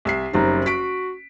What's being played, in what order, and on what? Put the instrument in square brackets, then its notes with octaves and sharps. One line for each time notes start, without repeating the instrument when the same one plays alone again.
[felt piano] C2 E5 C7
[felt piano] F#1 G3 C4 [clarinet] D#4
[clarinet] F#4 [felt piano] B6 D7